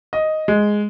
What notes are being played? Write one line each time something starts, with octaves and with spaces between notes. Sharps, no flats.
D#5
G#3